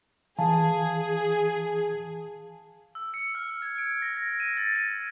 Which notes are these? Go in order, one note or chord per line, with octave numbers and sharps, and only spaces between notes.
E3 G#4 F5 G#5 A5
E6
C#7
F6
F6
G#6
D7
A#6
A#6
D#7
A6
D#7